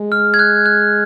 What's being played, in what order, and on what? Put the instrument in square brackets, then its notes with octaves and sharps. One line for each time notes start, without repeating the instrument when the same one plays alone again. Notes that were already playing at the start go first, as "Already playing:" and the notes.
Already playing: [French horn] G#3
[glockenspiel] F6
G#6
F#6
F#6